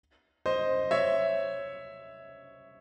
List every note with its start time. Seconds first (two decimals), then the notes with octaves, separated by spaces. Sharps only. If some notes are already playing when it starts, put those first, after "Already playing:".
0.46 C5 D#5
0.91 C#5 E5